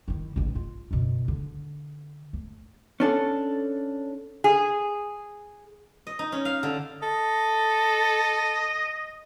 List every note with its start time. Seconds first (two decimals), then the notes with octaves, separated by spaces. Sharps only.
0.08 D#3 E4
0.36 A1 G#2
0.55 F4
0.91 F#2 B2
1.28 D3
2.33 A3
3.00 C#4 D4 A4
4.44 G#4
6.07 D#5
6.19 D#4
6.32 C#4
6.45 F5
6.63 D3
7.02 A4 D#5